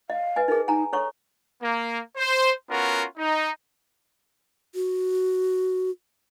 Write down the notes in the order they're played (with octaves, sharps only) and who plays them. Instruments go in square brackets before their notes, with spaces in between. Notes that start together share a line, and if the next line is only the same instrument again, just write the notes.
[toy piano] D#5 [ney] F5
[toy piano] B4 D#5 G#5
[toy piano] D#4 G#4 [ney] A#4
[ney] D#4 [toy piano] G#5 A#5
[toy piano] A4 C#5 C#6 [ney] A#5
[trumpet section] A#3
C5
B3 C#4 F4 F#4 A#4
D#4
[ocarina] F#4